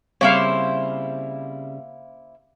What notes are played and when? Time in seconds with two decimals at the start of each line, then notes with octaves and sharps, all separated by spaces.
0.21 C#3 G3 A#3 C4 E4 C5 C#5 F5